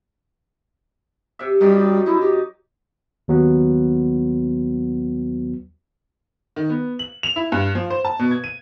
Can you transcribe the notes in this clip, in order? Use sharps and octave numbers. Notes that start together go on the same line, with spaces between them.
C3 E5
F#2 G3 D#4 G4
D#4 E4
G4
D#2 F#3 B3
D#3
B3
F#7
F7
E4
G2
F3
C5
A5
B2
G#6
D#7